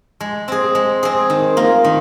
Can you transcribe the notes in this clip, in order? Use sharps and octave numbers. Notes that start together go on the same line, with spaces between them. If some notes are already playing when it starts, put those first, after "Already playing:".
G#3
C4 G#4
G#3
C4 G#4
D#3
A#3 F4
D#3